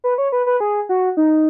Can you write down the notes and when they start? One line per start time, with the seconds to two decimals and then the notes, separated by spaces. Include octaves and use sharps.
0.04 B4
0.18 C#5
0.32 B4
0.46 B4
0.60 G#4
0.89 F#4
1.17 D#4